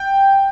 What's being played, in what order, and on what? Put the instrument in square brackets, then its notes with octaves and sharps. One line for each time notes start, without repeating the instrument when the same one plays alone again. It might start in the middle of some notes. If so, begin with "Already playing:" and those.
Already playing: [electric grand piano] G5